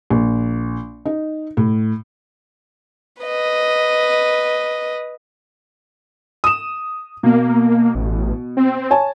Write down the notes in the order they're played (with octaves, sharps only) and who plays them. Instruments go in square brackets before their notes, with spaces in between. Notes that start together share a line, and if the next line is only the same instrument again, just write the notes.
[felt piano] A#1
D#4
A2
[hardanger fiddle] B4 D#5
[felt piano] D#6 E7
[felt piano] B2 [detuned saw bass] A#3
[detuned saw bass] A1
C4
[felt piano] C#5 G#5 A5